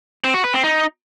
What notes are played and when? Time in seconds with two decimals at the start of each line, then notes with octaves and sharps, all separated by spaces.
0.24 C4
0.34 F#4
0.44 B4
0.54 C4
0.64 D#4